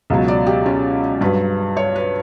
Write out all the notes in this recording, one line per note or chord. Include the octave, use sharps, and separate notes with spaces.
C#2 B2 F#3
D5
G4
C#4
G2 F#3 B4
C#5
B4